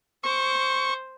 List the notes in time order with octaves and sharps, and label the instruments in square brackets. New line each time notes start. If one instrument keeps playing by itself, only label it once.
[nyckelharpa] C5 [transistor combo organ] C#6